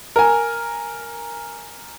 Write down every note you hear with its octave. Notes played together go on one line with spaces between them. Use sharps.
A#4 G#5